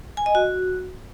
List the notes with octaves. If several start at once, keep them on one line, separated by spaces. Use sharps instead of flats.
G#5
D#5
F#4